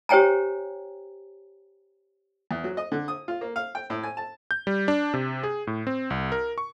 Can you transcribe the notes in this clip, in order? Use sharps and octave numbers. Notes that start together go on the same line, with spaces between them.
G4 C5 C#5 G5 G#5 A#5
E2
F#3
D#5
D3
D#6
F4
A#3
F5
G5
A2
G#5
A5
G6
G3
D4
C3
G#4
A2
C4
C2
A#4
C#6